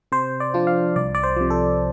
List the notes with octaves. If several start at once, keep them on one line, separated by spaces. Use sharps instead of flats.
C3 C5
D5
F3 D4 F4
F5
C2 D5
D5
C5
C3 F3
A4